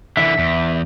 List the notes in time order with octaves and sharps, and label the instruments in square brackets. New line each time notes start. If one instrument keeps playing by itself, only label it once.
[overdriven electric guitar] D3 E3 [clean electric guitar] E5
[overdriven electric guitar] E2